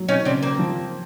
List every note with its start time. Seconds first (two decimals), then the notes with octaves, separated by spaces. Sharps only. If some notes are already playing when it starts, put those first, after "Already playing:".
Already playing: F#3
0.09 C#4 D#4
0.25 C#3 C4 D4
0.43 A#3 C4
0.59 F3